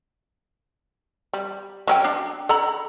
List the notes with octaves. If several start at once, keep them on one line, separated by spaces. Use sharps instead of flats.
G3
F#3 C#4 G5
D4
A4 A#5 B5